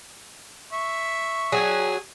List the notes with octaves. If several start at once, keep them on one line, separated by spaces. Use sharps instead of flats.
E5 C#6
F#3 C#4 G#4